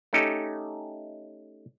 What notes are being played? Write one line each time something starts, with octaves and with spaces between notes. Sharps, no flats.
A3 C#4 D#4 G4 A4